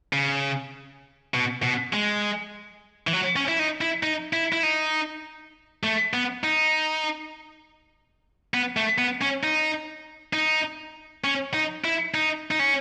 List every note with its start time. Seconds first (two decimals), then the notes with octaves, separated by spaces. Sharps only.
0.13 C#3
1.34 B2
1.63 B2
1.93 G#3
3.07 E3
3.13 F#3
3.36 C#4
3.48 E4
3.59 D#4
3.81 E4
4.03 D#4
4.33 E4
4.53 E4
4.63 D#4
5.84 A3
6.14 B3
6.44 D#4
8.54 B3
8.77 A3
8.98 B3
9.22 C#4
9.44 D#4
10.33 D#4
11.24 C#4
11.54 D#4
11.85 E4
12.14 D#4
12.51 D#4
12.59 C#4